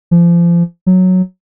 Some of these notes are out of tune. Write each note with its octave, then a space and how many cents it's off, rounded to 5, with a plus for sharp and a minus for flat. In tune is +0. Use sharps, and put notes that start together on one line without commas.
F3 -30
F#3 -5